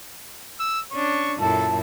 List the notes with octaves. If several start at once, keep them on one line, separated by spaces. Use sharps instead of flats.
E6
C#4 D4 C#6
F#2 A#2 E4 A4 A5